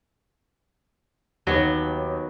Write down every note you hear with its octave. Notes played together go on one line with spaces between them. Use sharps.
D#2 F#3 B3